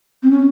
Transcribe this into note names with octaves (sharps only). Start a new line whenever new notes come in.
C4
C#4